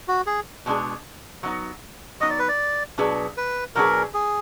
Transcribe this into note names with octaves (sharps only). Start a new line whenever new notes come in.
F#4
G#4
B2 G#3 D4 G#4
F#3 B3 D#4
F#3 B3 D#4 D#5
D5
B4
D5
B2 F#3 D4 G#4 B4
B4
B2 F#3 D4 G#4 A#4 B4
G#4